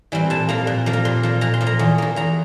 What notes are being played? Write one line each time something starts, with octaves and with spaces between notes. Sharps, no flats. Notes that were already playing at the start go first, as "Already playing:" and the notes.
E3 G3 C4
A#2 A5
F3 A#3 A#5
A#2
F3 A#3
A#5
A#2 C6
F3 A#3
A#2 A#5
C6
F3 A#3
A#5
E2
E3 A#3
E2 A#5